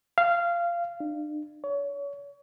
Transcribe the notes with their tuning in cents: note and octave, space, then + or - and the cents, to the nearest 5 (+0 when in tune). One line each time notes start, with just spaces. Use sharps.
F5 -15
D4 +40
C#5 +30